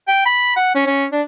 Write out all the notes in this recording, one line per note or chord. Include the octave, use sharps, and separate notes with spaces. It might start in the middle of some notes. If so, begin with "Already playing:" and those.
G5
B5
F#5
C#4
C#4
D4